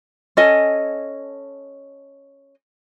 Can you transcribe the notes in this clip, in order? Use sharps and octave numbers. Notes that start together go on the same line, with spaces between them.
C#4 A4 D#5 G#5